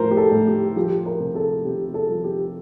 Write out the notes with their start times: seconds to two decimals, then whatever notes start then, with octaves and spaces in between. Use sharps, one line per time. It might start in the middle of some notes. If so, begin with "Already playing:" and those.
Already playing: A2 F3 A#4 C5
0.11 G4
0.17 A4
0.31 A2
0.47 G4
0.76 F3 G4
1.06 A#4
1.20 C3
1.35 A4
1.65 C3 G4
1.94 A4
2.09 F3
2.24 G4